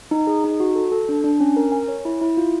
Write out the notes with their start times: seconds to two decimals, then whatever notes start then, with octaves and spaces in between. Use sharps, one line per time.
0.11 D#4
0.27 G#4
0.44 D#4
0.60 F#4
0.75 A4
0.92 A4
1.09 D4
1.24 D4
1.40 C#4
1.57 A#4
1.72 G#5
1.88 C#5
2.05 E4
2.21 E4
2.37 F4